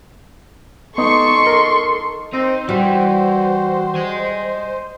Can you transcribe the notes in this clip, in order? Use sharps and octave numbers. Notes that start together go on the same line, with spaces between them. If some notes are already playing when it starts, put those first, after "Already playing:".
B3 D#4 A4 C6 C#6
A#4
C4 D#4 C5
E3 G3 F#4
D#5 G#5